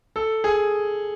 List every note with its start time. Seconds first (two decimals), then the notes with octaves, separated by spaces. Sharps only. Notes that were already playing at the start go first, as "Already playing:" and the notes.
0.16 A4
0.44 G#4